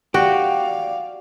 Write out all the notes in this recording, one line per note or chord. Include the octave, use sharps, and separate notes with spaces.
F#4 G4 D5 F5